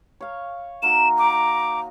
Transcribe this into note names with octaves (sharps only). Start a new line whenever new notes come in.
C#5 F5
A#3 D#4 F#4 E7
A#5 D6